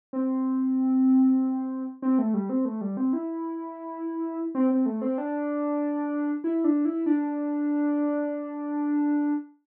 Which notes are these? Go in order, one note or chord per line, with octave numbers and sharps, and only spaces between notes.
C4
C4
A3
G3
C4
A3
G3
C4
E4
C4
C4
A3
C4
D4
E4
D4
E4
D4